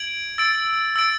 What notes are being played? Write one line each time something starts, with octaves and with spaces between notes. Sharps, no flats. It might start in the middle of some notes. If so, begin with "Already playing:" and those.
Already playing: G#6 D7 F#7
E6 A6 D7
E6 A6 D7